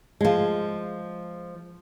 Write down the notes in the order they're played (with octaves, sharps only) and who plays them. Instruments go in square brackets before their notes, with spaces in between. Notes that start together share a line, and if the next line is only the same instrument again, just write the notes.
[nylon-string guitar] F3 G#3